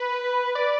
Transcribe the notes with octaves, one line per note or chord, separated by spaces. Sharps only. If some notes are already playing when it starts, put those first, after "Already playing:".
Already playing: B4
D5